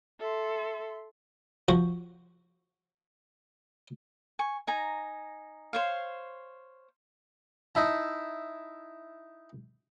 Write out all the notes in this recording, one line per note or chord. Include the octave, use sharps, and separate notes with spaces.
A4 E5 C6
F3 F#4 C5
G#5 C#6
D#4 G#5 A#5
C5 C#5 F5
D#4 E4 A5